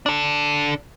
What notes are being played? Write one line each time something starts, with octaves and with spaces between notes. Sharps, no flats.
D4 A4